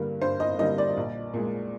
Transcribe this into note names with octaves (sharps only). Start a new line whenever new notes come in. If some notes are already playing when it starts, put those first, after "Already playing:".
Already playing: G2 D3 G3 A#3
G2 C5
D#5
D3 G3 A#3 D#5
D5
A#1
A#2 G#3